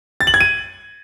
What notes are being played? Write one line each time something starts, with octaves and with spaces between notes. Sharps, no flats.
A6
F#7
G#6
D#7